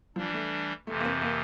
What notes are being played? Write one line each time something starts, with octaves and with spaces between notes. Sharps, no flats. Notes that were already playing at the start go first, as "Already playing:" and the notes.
E3 F3 G3 D4
A3
F2 C3 E3 A3
A#3
C4
A#3